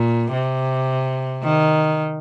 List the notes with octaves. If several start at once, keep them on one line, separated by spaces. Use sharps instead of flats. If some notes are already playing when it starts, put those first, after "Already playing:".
Already playing: A#2
C3
D#3